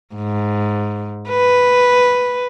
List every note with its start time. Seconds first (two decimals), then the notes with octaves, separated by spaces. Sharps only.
0.15 G#2
1.29 B4